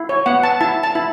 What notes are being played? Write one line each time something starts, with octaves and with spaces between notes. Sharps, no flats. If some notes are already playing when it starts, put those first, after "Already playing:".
Already playing: E4
C#5
B3 F#5
A5
E4 A5
A5
E4